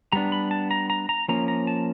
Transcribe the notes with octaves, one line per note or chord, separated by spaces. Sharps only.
G3 B3 D4 A#5
B5
A5
A#5
A#5
A#5
F3 A#3 C#4 A#5
A#5
A5